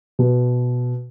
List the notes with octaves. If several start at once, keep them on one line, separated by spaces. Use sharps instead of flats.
B2